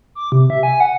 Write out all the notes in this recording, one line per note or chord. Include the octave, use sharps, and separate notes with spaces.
D6
C3
E5
G#5
F#5